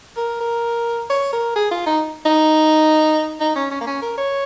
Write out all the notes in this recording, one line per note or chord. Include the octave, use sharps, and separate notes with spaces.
A#4
A#4
C#5
A#4
G#4
F4
D#4
D#4
D#4
C#4
C#4
A#3
C#4
A#4
C#5